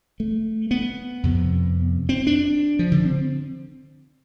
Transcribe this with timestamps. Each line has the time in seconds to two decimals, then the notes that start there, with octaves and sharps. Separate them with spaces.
0.20 A3
0.71 B3
1.23 F2 C3
2.09 C4
2.27 D4
2.79 F3
2.92 D3
3.05 C4